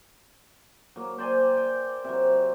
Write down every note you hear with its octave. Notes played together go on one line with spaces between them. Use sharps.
F#3 A#3
C5 D5 G5 G#5
G5
C3 F#3